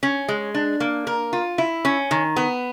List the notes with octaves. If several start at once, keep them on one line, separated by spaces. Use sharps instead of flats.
C#4
G#3
D4
A#3
A#4
F4
E4
C#4
D#3
B3